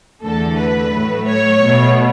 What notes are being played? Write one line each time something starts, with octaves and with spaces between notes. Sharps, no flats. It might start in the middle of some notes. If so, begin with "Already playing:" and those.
E2 D3 A3 A4
B4
A2 F#3 A3
C#5
B2 A3